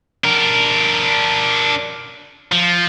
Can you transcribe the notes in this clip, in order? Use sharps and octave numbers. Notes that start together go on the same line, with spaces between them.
D4 A#4
F3